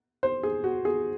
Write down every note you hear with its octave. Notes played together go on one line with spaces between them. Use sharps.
C5
G#4
F#4
G#4